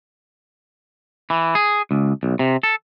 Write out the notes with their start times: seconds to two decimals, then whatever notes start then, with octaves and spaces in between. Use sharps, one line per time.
1.30 E3
1.55 G#4
1.91 C#2
2.23 B1
2.39 C3
2.63 A4